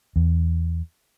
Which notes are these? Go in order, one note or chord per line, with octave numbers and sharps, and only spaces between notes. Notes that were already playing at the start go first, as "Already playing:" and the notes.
E2